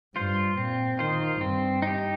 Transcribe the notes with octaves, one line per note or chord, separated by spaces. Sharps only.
G2 F4 C5
A#2 C4
D#3 F4 C5
G2 C4
D#4 G4